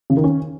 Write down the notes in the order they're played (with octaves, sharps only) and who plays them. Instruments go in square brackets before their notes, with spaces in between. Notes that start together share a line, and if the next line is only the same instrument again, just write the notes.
[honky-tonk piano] C#3
D#3
C#4